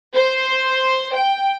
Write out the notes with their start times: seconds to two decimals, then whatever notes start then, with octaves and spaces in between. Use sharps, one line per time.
0.15 C5
1.14 G5